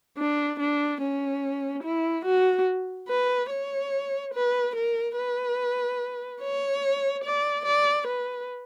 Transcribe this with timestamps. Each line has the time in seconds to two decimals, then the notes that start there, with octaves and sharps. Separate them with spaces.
0.18 D4
0.60 D4
1.01 C#4
1.84 E4
2.25 F#4
3.08 B4
3.50 C#5
4.34 B4
4.75 A#4
5.17 B4
6.41 C#5
7.24 D5
7.65 D5
8.07 B4